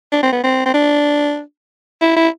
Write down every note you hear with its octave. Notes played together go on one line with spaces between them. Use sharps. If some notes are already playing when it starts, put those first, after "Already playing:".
D4
C4
B3
C4
C4
D4
E4
E4